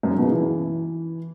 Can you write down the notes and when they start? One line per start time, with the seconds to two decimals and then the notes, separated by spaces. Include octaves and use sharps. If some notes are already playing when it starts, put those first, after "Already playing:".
0.03 F#2
0.10 G#2
0.18 B2
0.24 C#3
0.32 E3